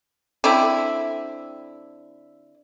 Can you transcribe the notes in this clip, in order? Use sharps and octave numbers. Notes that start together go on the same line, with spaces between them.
D3 C4 E4